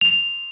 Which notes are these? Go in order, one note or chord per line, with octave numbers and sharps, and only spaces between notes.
F7